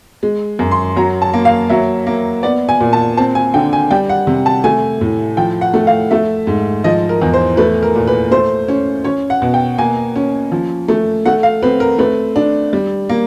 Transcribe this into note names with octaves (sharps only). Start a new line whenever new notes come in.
G#3
F#2
C6
F#3 A#5
A5
A#3
F5
F#3 E5
A#3
B3 D5
G#5
A#2
A5
C4 A5
G#5
D3 G5
G#5
G3 G5
F#5
C3
A5
A3 G#5
A2
F3 G5
F#5
A3
F5
A3 E5
G#2
F3 D#5
A#4
E2
C5
A3 B4
A#4
A#2
B4
A3 C5
C#4
C#4 C#5
F#5
B2
G5
A#3 G#5
C#4
F3
A3
A3 F#5
F5
C4 B4
A#4
A3 B4
D4
G3
A#3